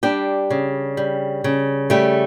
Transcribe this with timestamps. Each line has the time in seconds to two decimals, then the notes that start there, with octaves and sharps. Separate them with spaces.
0.03 G3 D4 G4
0.51 C#3
0.97 G3
1.44 C#3
1.90 G3 A3 G4